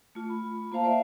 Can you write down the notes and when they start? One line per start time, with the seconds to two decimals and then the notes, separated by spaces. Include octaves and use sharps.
0.15 A3 F4
0.29 B5
0.72 A#3 F4 C5 F5 A5
0.84 C5 D5 E5